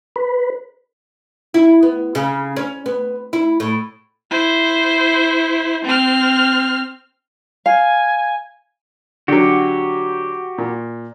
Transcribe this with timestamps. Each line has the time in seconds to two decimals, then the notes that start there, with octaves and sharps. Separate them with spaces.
0.16 B4
1.54 E4
1.83 B3
2.15 C#3
2.56 C#4
2.86 B3
3.33 E4
3.60 A2
4.31 E4 C5
5.85 C4 F6
7.66 F5 G#5
9.28 D3 F#3 F#4 G4
10.58 A#2